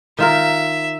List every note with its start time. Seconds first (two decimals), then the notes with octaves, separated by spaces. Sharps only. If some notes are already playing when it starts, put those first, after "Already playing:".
0.19 D#3 F4 A#4 E5